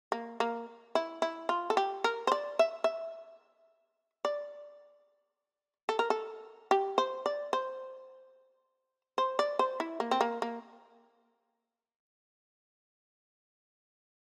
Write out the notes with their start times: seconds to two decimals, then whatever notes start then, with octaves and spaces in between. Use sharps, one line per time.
0.12 A#3
0.40 A#3
0.95 E4
1.22 E4
1.49 F4
1.70 A4
1.77 G4
2.04 A#4
2.27 C5
2.32 D5
2.59 E5
2.84 E5
4.25 D5
5.89 A4
5.99 A#4
6.10 A4
6.71 G4
6.98 C5
7.26 D5
7.53 C5
9.18 C5
9.39 D5
9.59 C5
9.80 E4
10.00 A#3
10.11 C4
10.21 A#3
10.42 A#3